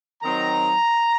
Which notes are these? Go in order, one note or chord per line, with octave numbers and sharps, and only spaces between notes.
D#3 F#3 C4 D#4 A#5